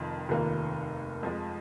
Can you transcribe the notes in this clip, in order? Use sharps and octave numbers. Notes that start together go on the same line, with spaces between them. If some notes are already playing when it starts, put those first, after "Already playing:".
Already playing: F1 F2 D#3
F1 D#2 D#3 A#3 F4
F2 F3 G#3